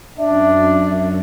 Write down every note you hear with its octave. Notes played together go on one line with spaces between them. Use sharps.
F#2 D4 E5